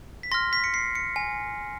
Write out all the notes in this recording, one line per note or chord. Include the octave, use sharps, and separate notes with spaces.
B6
C6 F6 A#6
B6
C#7
C7
C#7
G#5